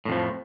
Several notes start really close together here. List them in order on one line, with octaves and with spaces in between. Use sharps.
A2 F2 F3